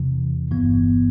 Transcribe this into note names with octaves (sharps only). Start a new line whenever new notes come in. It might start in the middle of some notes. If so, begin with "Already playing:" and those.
Already playing: E2 C3 E3
G1 G2 E3 B3